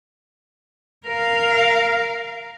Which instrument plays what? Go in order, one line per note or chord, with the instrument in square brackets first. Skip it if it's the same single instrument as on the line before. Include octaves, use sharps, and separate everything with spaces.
[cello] A#4 F5